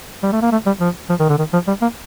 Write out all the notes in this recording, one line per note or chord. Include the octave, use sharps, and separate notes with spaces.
G3
A3
A#3
A3
G3
F3
F3
D#3
D3
D#3
F3
G3
A#3